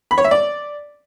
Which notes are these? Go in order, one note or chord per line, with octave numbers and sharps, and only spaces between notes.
B5
C#5
E5
D5